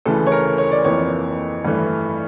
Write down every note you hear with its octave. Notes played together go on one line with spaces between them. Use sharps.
D2 C#3 E3 A4
C#5
A#4
C#5
D5
F2 E3 A#3 C#5
G2 E3 A3